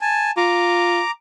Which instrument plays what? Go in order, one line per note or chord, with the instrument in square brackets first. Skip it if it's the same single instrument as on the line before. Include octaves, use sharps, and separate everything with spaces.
[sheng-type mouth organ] G#5 A5
[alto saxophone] F4 [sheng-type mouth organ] A#5 D6